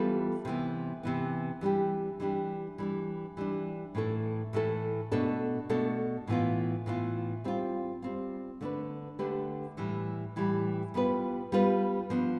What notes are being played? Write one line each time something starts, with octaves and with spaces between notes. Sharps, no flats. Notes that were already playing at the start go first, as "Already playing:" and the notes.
Already playing: E3 G3 B3 F4 A4
C3 E3 B3
C3 E3 B3
E3 G3 D4 G4
E3 G3 D4 G4
E3 G3 D4
E3 G3 D4
A2 E3 A3 E4 A4
A2 E3 A3 E4 A4
B2 A3 D4 A4
B2 A3 D4 A4
A2 E3 B3 F4
A2 E3 B3 F4
G3 C4 F4
G3 C4 F4
D3 A3 D4 G4 B4
D3 A3 D4 G4 B4
A2 E3 G3
A2 E3 G3
G3 B3 F4 B4
G3 B3 F4 B4
F3 B3 D4